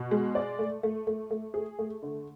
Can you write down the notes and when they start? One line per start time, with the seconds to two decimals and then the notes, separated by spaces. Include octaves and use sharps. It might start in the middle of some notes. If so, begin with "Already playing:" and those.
Already playing: B2
0.11 G#3
0.35 D5
0.59 A3
0.83 A3
1.07 A3
1.31 A3
1.54 G#4
1.79 A3
2.03 D3